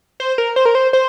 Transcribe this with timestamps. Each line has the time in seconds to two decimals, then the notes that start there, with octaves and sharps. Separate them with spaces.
0.20 C5
0.38 A#4
0.56 C5
0.65 A#4
0.75 C5
0.93 C5